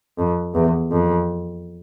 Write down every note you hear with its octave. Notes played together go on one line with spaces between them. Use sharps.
F2
E2
F2